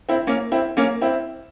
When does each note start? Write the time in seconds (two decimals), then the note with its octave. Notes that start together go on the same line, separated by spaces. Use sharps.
0.09 C4 E4
0.27 A#3 C#4
0.52 C4 E4
0.77 A#3 C#4
1.02 C4 E4